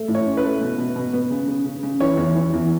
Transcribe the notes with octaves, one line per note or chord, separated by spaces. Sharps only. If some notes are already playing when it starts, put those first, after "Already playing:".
Already playing: A3
A2
C#5
C#4
B4
A3
B2
B2
B2
B3
C#3
C#3
C#3
C#3
E3 C#5
E2
E3
E2